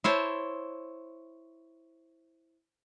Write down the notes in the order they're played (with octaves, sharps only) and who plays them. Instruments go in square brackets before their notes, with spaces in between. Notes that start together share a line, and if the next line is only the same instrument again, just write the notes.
[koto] E4 C5 C#5 A5